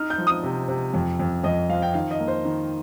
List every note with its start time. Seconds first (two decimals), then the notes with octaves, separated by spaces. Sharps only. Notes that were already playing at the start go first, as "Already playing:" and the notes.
Already playing: D#4 F6
0.10 G6
0.18 F3
0.27 D#6
0.43 C3
0.68 C3
0.94 F2
1.20 F2
1.43 F2 D#5
1.69 F3 F5
1.82 G5
1.94 D#3 F5
2.11 D#5
2.20 A#3
2.28 C5
2.45 D#3